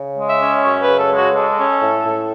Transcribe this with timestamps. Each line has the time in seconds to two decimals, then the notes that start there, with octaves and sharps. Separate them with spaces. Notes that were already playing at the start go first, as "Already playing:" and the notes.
Already playing: C#3
0.17 G#3
0.29 E5
0.41 C#4
0.64 F#2 C#5
0.81 B4
0.88 C#3
0.99 A4
1.11 G#3
1.17 F#4
1.34 G#3 A4
1.58 C#4
1.81 A2
2.05 A2